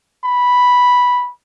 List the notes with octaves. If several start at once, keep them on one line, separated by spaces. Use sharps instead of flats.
B5